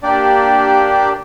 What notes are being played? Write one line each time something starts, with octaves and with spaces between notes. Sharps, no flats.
A#3 D4 G4 D5